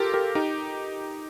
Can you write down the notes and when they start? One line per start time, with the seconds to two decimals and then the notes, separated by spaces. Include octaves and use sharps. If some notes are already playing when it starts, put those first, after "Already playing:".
Already playing: F4 G4 A4 A#4
0.14 G4 A#4
0.35 D#4 G4